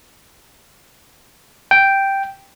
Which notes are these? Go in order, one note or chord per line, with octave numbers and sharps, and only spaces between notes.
G5